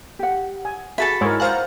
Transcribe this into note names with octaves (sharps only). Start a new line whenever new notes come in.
G4 F#5
G#5
F#4 G#4 A4 E5 A5 B5
G#2 G#3 E4 A#4 C#5
C5 F5 F#5 G#5 A#5 A6